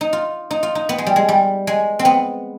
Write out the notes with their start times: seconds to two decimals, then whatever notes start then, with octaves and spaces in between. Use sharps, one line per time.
0.01 D#4
0.13 F4
0.51 D#4
0.63 F4
0.75 D#4
0.89 B3
0.98 G#3
1.07 G3
1.16 G#3
1.29 G3
1.67 G#3
1.99 C4
2.05 B3